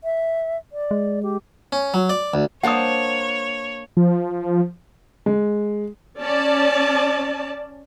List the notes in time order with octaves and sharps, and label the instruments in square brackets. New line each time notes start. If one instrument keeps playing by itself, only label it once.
[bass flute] E5
D5
[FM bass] G#3
[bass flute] G4
[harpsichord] C#4
F#3
D5
D2
[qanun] A#3 D4 C5 [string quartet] C#5 [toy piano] F#5 D#6
[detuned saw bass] F3
[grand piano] G#3
[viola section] C#4 D5 A5